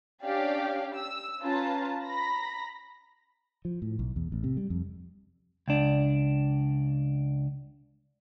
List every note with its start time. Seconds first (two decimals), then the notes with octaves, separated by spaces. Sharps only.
0.23 C#4 D4 G4 D5 F5
0.95 E6
1.42 C#4 F4 B4 A5 A#5
2.04 A#5 B5 A#6
3.65 F3
3.82 A2
3.99 B1
4.16 E2
4.32 A1
4.44 C3
4.57 G3
4.70 F2
5.68 C#2 D4